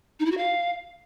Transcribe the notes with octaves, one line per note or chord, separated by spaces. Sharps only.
D#4
E4
F#4
F5